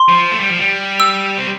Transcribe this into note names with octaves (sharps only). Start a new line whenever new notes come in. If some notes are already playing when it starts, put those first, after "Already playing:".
Already playing: C6
F3
A3
G3
F3
G3
E6
C4